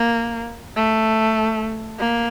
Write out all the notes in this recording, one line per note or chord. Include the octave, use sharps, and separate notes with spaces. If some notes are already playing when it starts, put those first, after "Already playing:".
Already playing: A#3
A3
A#3